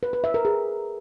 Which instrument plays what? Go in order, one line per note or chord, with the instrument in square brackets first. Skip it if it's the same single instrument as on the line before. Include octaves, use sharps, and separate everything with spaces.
[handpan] B4
B4
E5
A#4
G#4